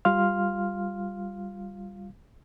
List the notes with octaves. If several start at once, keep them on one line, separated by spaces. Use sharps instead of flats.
G3 F4 F5 C6 F6